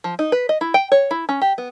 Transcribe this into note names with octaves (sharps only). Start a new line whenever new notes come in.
F3
D#4
B4
D#5
E4
G5
C#5
E4
C#4
G4
B3